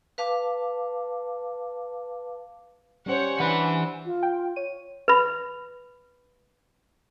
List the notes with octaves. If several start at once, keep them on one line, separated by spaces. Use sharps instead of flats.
B4 F5 A5 D6
G3 C#4 C5 C#5 F#5
E3 D4 B4 F#5
F4
G5
C#5 D#7
B4 B5